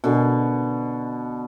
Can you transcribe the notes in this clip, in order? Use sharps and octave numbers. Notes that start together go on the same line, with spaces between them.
B2 D3